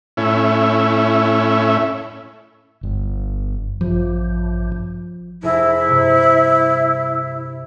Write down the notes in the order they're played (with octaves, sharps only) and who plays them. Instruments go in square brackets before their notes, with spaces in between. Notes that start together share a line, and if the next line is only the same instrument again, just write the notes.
[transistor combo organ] A2 C#4 E4
[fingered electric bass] G1
[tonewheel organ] A1 G2 [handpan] F3
[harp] F1 G#4 A#6 [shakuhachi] E4
[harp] G2 C3